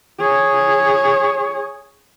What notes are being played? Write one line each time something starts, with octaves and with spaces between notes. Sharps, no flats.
G#4 C#5